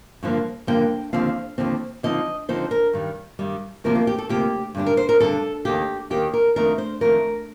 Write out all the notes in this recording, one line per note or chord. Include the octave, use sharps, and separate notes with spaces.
G2 D3 F3 A#3
G2 D3 F3 A#3 G5
D#2 D3 F3 C4 F5
D#2 D3 F3 C4
D3 F3 C4 D#4 D#5
D3 F3 C4 D#4 C5
A#4
G2 D#3 G3
G2 D#3 G3
D2 C3 F3 A#3 A#4
F4
G4
A4
D2 C3 F3 A#3 G4
G2 D3 G3 D4
A#4
C5
A#4
G2 D3 G3 D4 A4
D#2 D#3 A#3 G4
D#2 D#3 A#3 G4
A#4
F2 D#3 A3 D4 A#4
C5
F2 D#3 A3 D4 A#4